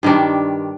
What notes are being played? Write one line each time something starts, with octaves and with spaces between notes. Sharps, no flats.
G2 D#3 G3 D4